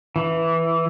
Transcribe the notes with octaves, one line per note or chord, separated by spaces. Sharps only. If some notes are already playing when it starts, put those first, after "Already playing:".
E3